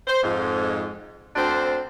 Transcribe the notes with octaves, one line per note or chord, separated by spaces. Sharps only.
C5
F2 G#2
D2 C4 D4 C5